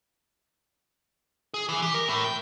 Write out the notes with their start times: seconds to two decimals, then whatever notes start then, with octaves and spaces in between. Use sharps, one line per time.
1.54 G#4
1.69 E3
1.82 G4
1.94 A#4
2.08 A2
2.24 G5